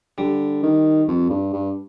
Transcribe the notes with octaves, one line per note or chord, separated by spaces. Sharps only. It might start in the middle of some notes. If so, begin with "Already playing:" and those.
D3 G3
D#3
F2
G2
G2